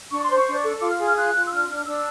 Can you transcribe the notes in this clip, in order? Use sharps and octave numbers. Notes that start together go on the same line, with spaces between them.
D4 C#6
C5 C6
C#6
D4
A4
F4 D6
F6
G#4
F6
F4 F#6
F4
E6
D4 F6
D4 F6
D4 E6